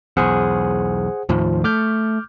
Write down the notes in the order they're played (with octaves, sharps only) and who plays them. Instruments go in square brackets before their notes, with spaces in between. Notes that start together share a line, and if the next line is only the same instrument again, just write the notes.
[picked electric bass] B1 E2 [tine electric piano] G#4 C5 F#5
[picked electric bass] D#2 A2 D#3 [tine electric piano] F3
[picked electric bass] A3 [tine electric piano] D6 F6 G6